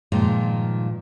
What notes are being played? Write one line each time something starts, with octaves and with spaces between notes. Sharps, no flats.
G2 A#2 D#3 F3 G#3